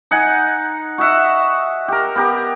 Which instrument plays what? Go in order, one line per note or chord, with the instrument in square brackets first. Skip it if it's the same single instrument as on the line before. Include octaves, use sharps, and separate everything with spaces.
[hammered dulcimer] D#4 F#5 G#5
F#4 D#5 E5 F#5
G4 A#4
B3 G4 A#4